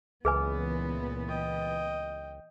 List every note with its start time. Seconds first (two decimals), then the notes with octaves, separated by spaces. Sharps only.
0.25 C#2 A#2 E3 B3 G#4 B4 G#5
1.29 D#5 G5